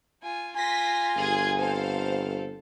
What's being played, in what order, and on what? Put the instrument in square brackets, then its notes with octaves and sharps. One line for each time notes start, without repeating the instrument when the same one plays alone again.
[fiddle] F4 G#5
[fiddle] F4 C6 [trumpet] G#5 [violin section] A#6 B6
[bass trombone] G1 [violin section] G#4 G#6
[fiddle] C4 A4 [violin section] C5 F5